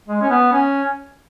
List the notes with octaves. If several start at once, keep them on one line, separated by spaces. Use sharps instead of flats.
G#3
C#4
B3
C#4